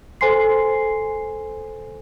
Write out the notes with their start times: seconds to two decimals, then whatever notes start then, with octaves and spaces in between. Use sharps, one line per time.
0.21 A4 C5 G#5 C6 C7